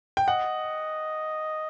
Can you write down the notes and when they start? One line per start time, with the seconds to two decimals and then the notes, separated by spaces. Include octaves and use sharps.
0.17 G5
0.28 D#5 F#5